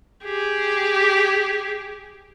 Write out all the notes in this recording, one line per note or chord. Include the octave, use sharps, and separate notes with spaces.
G4 G#4